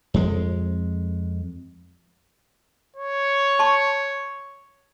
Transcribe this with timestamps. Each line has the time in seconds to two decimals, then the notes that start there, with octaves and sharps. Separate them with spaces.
0.14 F2 G#3
2.97 C#5
3.59 A5 C6 C#6